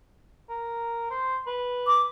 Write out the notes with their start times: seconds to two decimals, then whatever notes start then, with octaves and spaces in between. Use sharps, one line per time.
0.50 A#4
1.10 C5
1.47 B4
1.87 D6